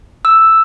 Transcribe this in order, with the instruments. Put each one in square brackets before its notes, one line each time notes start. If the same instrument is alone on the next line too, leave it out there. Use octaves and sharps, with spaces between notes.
[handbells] E6